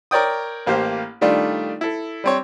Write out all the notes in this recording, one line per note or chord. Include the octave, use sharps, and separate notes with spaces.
A#4 C#5 D5 G5 D#6
A1 A#3 G4 C5 F5
D#3 G3 A3 D4 F4
E4 A4
G3 C4 C#5